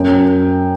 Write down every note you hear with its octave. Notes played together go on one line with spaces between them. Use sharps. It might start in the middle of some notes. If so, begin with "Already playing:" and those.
Already playing: F#2 G5